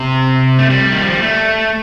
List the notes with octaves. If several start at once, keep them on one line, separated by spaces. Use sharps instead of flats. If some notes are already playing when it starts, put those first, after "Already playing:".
Already playing: C3
A3
G3
D#3
F3
G3
A3